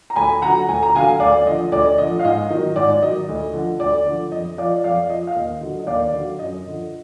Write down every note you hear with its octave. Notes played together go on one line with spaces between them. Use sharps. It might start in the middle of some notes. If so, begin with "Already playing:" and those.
A#5
D2 G#5 B5
D3 F#3 F#5 A#5
D2 G#5
A#5
D3 F#3 F5 G#5
D2 D5 F5
D3 F3 D#5
D2 D5
D3 F3 D#5
F5
G#2 D#5
D#3 F#3 D#5
G#2 D5
D#3 F#3 D#5
D2
D3 F3
D2 D5
D3 F3
F2 D#5
F3 D5 F5
F2 D5 F5
F3 D#5
F5
D#2 D#5
D3 F#3
D#5
D#2 D5 F5
D3 F#3
F#2 D#5
D3 F3